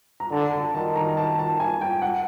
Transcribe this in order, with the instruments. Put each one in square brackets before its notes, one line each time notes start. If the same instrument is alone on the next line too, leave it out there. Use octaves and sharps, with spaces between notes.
[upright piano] A#5
[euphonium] D3 [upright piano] A5
[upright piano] A5
[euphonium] D#3 [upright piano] A5
[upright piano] A#5
A5
A5
G#5
G5
F#5